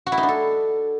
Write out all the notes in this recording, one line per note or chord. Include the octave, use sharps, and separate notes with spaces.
F#4
E4
D#4
D4
A4